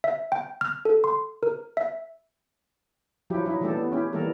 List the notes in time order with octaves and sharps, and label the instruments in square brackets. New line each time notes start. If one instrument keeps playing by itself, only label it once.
[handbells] E5
G5
F6
A4
C6
A#4
E5
[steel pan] F3 F#3 E4 F#4 G4
F#3 D#4 E4
E3 G3 A3 D4 G4 A4
B3
C#4 E4 G4
D#3 E3 G3 A#3 A4 A#4